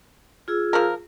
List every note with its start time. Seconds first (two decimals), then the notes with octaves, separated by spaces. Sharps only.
0.48 F4 G#4 E6
0.73 F3 A#4